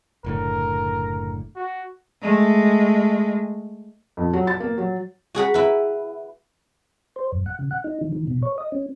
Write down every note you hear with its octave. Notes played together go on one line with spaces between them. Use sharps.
F#1 A2 D3 A#4
F#4
G#3 A3
F2
F#3
A6
A#3
F#3
F#4 G#4 F#5 B5
E4 B4
C5
F#2
F#5
C#3
F#5
D#4
D#3
D#3
B2
C#5
D#5
C#4